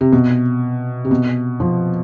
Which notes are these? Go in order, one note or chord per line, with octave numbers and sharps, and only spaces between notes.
C3
B2
C3
B2
F3